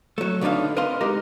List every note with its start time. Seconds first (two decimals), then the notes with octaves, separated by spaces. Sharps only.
0.18 F#3 A3
0.41 D2 D3 B3 D4 D#4 F5
0.77 A#4 B4 D#5 F5 C6
1.01 G#3 D#4 G4 A#4